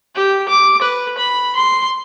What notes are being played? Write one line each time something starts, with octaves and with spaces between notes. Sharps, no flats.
G4
D6
B4
B5
C6